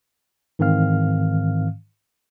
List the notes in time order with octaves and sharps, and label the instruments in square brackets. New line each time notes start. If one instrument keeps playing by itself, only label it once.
[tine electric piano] G#2 D#3 E3 C4 F5 F6